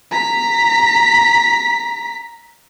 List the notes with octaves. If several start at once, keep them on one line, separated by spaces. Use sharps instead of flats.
A#5 B6